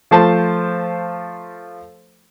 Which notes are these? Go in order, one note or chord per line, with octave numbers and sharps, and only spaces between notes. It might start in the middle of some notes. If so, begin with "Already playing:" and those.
F3 A3 C5 A5 C6